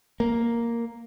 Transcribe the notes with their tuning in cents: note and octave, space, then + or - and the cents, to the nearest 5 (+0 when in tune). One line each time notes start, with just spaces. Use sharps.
A#3 +0